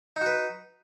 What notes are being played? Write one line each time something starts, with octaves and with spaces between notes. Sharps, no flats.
D#4 F#4 B4